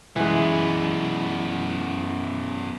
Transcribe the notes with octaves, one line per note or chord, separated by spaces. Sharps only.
F#2 E3 G#3 B3